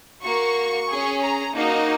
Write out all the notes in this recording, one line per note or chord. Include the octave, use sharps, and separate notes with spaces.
A#3 F#4 C#6
C#4 G#4
A#5
A#3 D#4 F#4